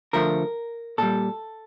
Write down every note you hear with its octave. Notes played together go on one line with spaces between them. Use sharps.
D3 F3 A3 A#4
A#2 G3 A4